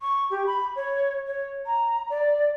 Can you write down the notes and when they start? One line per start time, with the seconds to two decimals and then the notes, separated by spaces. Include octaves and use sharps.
0.01 C#6
0.31 G4
0.47 B5
0.76 C#5
1.27 C#5
1.66 A#5
2.10 D5